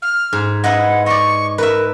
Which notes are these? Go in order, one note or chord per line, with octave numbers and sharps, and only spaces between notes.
F6
G#2
E4 B4 D#5 F#5
D5 D#5 C#6
A#4 B4 E5